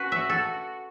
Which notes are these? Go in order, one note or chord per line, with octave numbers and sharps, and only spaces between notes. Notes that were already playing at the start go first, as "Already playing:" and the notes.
Already playing: C#4 F#4 B4
E5
A4